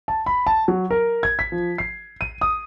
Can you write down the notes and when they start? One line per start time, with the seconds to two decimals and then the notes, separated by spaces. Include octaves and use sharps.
0.08 A5
0.26 B5
0.47 A5
0.68 F#3
0.91 A#4
1.23 G#6
1.39 B6
1.52 F3
1.78 C7
2.21 D#7
2.41 D#6